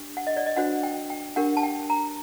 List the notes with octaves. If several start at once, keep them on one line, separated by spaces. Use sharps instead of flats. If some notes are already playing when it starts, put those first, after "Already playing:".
Already playing: D4 G4
F#5
D#5
D5
D#5
D4 F#4 C5 F#5
G5
G5
D4 G4 A#4 F#5
A5
G5
A#5